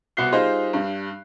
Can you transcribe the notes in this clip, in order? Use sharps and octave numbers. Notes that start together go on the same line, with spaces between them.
C2 B3 F#4 F#6 C7 G7
G3 D#4 F4 G#4 C5 D#5
G2 G3